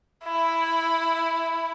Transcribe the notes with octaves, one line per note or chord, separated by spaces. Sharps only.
E4